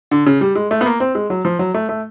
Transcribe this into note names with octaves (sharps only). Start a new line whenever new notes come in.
D3
C#3
G3
G#3
A3
B3
A#3
C4
G#3
F#3
F3
F#3
A3
A3